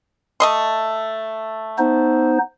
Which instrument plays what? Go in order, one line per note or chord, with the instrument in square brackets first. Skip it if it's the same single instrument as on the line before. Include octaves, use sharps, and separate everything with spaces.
[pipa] A3 D#5 C6
[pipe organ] B3 D#4 C5